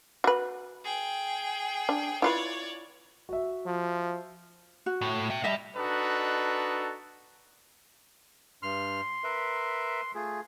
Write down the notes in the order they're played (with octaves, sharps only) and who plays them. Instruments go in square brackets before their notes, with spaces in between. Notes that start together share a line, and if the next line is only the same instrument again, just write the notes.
[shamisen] F#4 B4
[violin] G#4 G5
[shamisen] D4
[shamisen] E4 F4 B4 [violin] C#5 D5
[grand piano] F#4 E5
[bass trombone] F3
[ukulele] F#4
[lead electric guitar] A2
E5 G5
[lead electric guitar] G3 [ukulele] D#5 E5 A5
[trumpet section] D4 D#4 F#4 A4 B4 D#5
[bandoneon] G2 F6 [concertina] C6
[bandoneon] A#4 B4 E5
[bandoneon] A3 F4 [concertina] G#4